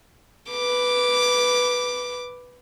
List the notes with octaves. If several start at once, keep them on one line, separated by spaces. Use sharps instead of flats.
B4 D6